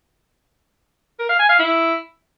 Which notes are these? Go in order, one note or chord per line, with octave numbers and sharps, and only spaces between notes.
A#4
F5
G#5
F5
E4